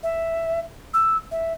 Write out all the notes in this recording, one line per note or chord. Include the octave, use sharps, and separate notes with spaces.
E5
E6
E5